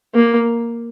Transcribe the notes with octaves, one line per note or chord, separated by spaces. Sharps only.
A#3